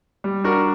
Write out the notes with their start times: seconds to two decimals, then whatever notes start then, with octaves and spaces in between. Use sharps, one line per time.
0.24 G3
0.44 D4 F#4 A#4